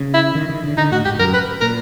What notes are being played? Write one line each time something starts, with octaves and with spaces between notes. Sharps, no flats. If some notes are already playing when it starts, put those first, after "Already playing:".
Already playing: C#3
E4
D#3
D#3
D3
D3 D#4
A2 F#4
G#2 G4
F#2 A#4
B4
A#2 A#4